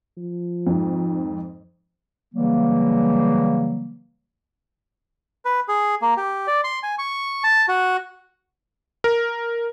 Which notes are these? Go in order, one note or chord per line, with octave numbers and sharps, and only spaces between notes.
F3
F2 G#2
C#3 E3 F#3 G3 A#3
B4
G#4
A#3
G4
D5
C6
G#5
C#6
A5
F#4
A#4